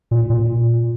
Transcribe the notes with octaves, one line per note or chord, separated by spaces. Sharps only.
A#2
A#2